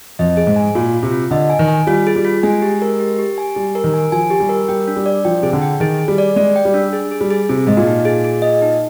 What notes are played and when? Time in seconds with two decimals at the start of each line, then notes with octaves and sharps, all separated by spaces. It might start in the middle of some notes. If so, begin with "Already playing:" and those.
0.19 F2 D#5
0.37 G#4
0.47 G#2
0.56 G#5
0.75 A#2 F4
0.94 F4
1.03 C3
1.12 F4
1.31 D3 D#5
1.50 G#5
1.59 D#3
1.68 G#5
1.87 G3 F4
2.07 G#4
2.16 G3
2.25 F4
2.43 G#3 G#5
2.62 G4
2.82 A#4
3.00 G4
3.19 G4
3.38 G#5
3.56 G3 G4
3.75 A#4
3.84 D#3
3.94 G#5
4.12 F3 G#5
4.30 G4
4.40 G3
4.49 A#4
4.68 G3 G5
4.88 D4
4.96 G3
5.06 D5
5.25 F3 G5
5.42 C3 G#4
5.53 D3
5.62 G5
5.80 D#3 G#4
5.99 G#4
6.08 G3
6.18 D5
6.36 G#3 D5
6.56 G5
6.65 G3
6.74 D4
6.93 G#4
7.11 G#4
7.21 G3
7.31 G#4
7.49 C3 G#4
7.67 G#2 D#5
7.77 A#2
7.87 D#4
8.05 G#4
8.24 G#4
8.42 D#5
8.62 D#4